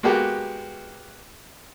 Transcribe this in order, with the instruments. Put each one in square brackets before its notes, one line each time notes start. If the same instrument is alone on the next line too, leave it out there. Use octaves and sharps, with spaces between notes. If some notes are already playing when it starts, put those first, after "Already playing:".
[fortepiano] G#3 A#3 B3 F#4 G4